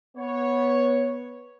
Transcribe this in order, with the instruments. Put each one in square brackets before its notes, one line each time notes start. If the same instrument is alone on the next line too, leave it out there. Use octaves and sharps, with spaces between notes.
[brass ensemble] B3 C#5